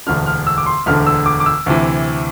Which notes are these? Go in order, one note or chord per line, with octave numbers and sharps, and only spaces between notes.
E1 D2 D3 F6
F6
E6
D6
C6
E1 D2 D3 F6
E6
D6
D6
E6
D2 C3 E3